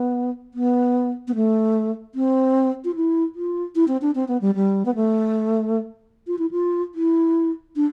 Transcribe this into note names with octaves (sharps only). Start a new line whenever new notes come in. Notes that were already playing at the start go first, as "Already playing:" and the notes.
Already playing: B3
B3
B3
A3
C4
F4
E4
F4
E4
C4
D4
C4
B3
G3
G3
B3
A3
F4
E4
F4
E4
D4